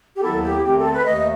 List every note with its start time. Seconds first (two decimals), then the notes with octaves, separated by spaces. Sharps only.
0.16 G4
0.22 D#2 D#3 F#3 B3 E4 A4
0.43 G4
0.64 E2 D#3 A3 C4 G4
0.79 A4
0.93 B4
1.06 D#2 D#3 A3 D#5